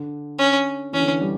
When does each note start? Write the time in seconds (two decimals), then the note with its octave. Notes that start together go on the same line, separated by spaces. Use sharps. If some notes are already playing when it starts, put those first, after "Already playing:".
Already playing: D3
0.38 C#4
0.93 E3 C#4
1.00 D3
1.07 E3
1.20 G3